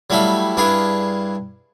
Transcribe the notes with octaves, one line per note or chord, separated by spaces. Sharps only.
F#3 G3 A3 E4 E5 F5
G2 D4 E4 G#4 F5